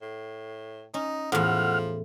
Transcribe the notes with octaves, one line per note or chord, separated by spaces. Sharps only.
A2
C#4 D#4
E2 A2 F3 F#5 F6